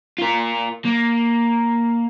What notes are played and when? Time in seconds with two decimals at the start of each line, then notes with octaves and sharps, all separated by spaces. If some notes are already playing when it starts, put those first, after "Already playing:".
0.18 F4 A#4
0.85 A#3